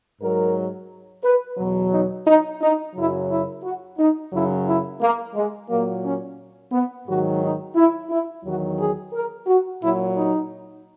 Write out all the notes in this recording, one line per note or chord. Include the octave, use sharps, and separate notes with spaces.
G#2 F#3 A#4
B4
E2 B2 F#3
D#4
D#4
D#4
F#2 C#3 F#3 E4
E4
F#4
D#4
F#2 C#3 F#3 E4
E4
A#3
G#3
A#2 F#3 A#3
C#4
B3
G#2 D#3 F#3 F#4
D#4
E4
E4
E2 D#3 F#3 F#4
G#4
A#4
F#4
A#2 F#3 E4
D#4